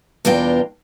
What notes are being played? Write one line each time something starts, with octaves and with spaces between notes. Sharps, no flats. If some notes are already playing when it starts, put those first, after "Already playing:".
E2 B2 D4 F4 A#4 G5